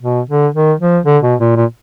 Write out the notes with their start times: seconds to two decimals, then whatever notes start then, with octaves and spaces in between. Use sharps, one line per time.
0.03 B2
0.29 D3
0.54 D#3
0.80 F3
1.06 D3
1.23 B2
1.40 A#2
1.56 A#2